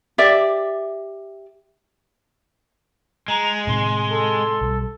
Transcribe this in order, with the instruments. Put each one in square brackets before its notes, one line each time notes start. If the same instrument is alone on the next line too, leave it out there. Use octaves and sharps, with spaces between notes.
[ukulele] G4 D5 E5
[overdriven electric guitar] G#3 [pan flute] A#5
[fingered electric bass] A2 C3 D#3 [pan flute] C6
[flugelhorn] A4
[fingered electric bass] B1 G3